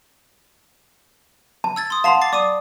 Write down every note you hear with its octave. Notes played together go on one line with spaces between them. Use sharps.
A5
E6 G#6 A6
C6 D#6
F5 F#5 A5 C6 C7 F7
D6 A6 C7
D5 D6 D#6 D#7